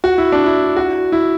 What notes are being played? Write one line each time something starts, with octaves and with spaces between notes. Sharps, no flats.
F#4
E4
D4
E4
F#4
E4